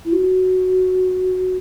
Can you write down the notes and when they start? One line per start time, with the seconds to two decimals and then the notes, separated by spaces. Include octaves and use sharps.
0.05 E4
0.12 F#4